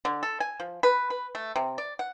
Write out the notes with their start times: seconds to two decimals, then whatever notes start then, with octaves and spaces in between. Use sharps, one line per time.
0.05 D3
0.23 A4
0.40 G#5
0.60 F3
0.83 B4
1.10 B4
1.35 A3
1.56 C3
1.78 D5
1.99 F#5